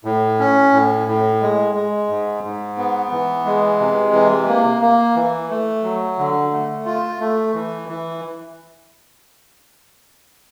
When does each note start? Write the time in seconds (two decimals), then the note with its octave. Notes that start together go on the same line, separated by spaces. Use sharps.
0.05 A2
0.40 C#4
0.73 A2
1.08 A2
1.42 G#3
1.75 G#3
2.09 G#2
2.44 G#2
2.78 B3
3.11 E3
3.45 G#3
3.80 C3
4.13 E3
4.48 A#3
4.82 A#3
5.16 E3
5.50 A3
5.83 F#3
6.18 D3
6.52 A3
6.86 F4
7.20 A3
7.54 E3
7.89 E3